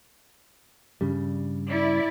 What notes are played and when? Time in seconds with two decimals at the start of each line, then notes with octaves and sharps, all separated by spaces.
1.01 G2 C#3 G3
1.68 E4 D5